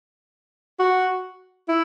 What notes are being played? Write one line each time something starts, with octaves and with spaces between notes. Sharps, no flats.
F#4
E4